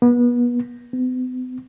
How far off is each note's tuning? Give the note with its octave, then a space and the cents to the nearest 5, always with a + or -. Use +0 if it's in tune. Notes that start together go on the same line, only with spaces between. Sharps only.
B3 -30
B3 +45